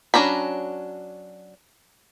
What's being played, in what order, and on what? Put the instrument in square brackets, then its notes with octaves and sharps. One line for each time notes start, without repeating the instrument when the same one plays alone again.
[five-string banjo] F#3 C#4 D4 A#5 B5